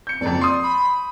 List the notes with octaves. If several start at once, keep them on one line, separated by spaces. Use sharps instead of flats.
G6 C#7
F#1 F2 D5
C6 D#6
B5